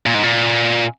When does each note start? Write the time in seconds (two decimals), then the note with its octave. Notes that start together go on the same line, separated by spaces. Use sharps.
0.06 A#2
0.14 G#2
0.23 A#2